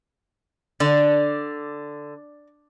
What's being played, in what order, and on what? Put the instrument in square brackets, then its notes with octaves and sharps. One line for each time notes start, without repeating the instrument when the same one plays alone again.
[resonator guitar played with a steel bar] D3 [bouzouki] D5